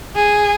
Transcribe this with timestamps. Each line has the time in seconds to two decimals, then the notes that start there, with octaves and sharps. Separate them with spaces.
0.16 G#4